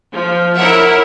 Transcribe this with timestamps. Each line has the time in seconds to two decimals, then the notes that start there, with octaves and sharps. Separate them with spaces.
0.13 F3
0.56 E4 A#4 C#5 E5 F#5